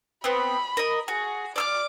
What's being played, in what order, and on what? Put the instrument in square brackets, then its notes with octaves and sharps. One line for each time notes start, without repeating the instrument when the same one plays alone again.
[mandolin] B3 C4 [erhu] B5
[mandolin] A#4 D#5
[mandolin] F#4 [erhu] G#4
[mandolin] D5 E6 F6 [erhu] D6